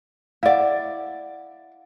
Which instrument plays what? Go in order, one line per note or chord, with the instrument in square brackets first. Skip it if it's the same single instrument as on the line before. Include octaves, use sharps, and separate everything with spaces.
[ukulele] E4 D5 [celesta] F5 F#5